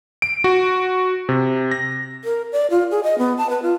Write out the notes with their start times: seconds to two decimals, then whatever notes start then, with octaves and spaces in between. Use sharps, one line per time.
0.22 D7
0.44 F#4
1.29 C3
1.71 A#6
2.24 A#4
2.52 D5
2.70 F4
2.91 G#4
3.04 D#5
3.18 B3
3.38 A5
3.50 B4
3.63 F4